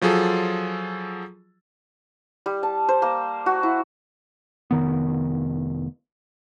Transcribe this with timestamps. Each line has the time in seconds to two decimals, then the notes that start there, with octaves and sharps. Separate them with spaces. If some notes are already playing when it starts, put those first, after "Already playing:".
0.02 F3 F#3 F4 G#4 A4
2.46 G3
2.63 A5
2.89 C5
3.02 A#3
3.46 F#4
3.63 E4
4.71 F1 D#3 B3